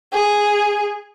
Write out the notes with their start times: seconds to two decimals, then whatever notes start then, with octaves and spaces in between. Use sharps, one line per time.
0.13 G#4